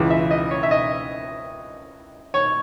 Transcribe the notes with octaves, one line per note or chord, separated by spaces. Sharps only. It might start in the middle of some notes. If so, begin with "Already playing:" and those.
Already playing: C#2 C#3 E3
E5
D#5
C#5
E5
D#5
C#5